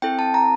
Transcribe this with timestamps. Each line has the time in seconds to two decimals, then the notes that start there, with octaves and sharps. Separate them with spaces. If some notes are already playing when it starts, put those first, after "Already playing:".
0.02 C4 E4 A4 G5
0.19 A5
0.34 A#5